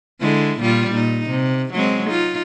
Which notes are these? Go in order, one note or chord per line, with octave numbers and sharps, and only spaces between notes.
D3 G#3 E4
A#2 G3 F4
A#2 D#4
C3
F#3 G#3 C4
D#4 F4